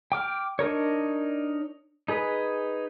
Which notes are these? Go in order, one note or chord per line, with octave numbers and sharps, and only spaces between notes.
G5 D6 F6
D4 D#4 A#4 C#5
D#4 G#4 B4